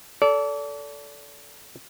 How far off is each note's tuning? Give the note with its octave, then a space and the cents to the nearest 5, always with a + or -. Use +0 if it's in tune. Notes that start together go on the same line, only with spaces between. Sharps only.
A4 +0 D5 -35